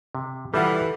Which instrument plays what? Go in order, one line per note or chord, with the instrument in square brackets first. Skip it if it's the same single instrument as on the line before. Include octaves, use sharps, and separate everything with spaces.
[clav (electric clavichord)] C3
[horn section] E3 [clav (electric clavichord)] G3 F4 [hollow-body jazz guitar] A4 E5 F#5